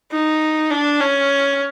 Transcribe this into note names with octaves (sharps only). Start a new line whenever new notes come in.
D#4
D4
C#4